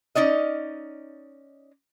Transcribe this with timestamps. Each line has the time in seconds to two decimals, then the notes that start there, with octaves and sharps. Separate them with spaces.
0.15 C#4 D#4 D5 D#5